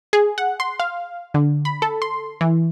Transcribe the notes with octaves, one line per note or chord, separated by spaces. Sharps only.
G#4
F#5
C6
F5
D3
B5
A4
C6
E3